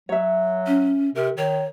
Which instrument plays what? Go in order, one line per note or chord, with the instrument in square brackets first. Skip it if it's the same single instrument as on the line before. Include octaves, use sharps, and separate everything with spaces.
[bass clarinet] F#3 [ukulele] C#5 E5
[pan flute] C#4
[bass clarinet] C3 [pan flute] A#4
[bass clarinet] D#3 [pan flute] C#5